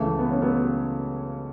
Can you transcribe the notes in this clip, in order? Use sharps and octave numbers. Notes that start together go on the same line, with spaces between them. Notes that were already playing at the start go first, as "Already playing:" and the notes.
Already playing: C#2 C#3 E3 A3
B3
C#4
F#3 B3